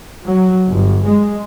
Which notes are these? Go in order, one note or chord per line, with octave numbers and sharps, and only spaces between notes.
F#3
G1
G#3